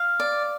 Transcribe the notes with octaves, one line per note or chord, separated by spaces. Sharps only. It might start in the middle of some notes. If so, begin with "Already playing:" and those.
Already playing: F5
D5